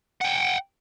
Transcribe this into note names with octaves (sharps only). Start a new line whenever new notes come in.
F#5 G5